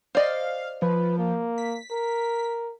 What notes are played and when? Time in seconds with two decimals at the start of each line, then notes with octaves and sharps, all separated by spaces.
0.15 C5 D5 D#5 F5
0.82 F3 B4
1.18 A#3
1.58 B6
1.91 A#4